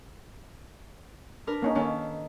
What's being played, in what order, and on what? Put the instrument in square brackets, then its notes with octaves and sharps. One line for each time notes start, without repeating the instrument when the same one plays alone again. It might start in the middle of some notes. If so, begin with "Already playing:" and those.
[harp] D4 A#4 B4
[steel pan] A#3 C#4 D#4
[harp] D#3 A4 [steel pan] A#3 C#4